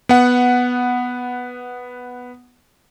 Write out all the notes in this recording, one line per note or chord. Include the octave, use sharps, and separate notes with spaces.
B3 F#5